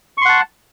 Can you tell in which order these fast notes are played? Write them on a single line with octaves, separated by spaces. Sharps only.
C#6 C6 F#5 A5